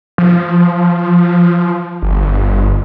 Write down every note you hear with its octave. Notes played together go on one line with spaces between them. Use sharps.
F3
G1